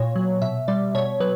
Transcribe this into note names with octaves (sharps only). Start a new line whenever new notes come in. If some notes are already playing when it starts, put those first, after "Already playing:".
Already playing: A#2 C#5
F#3
B2 E5
G3 D5
B2 C#5
F#3 B4